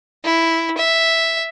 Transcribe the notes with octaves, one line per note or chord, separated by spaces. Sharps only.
E4
E5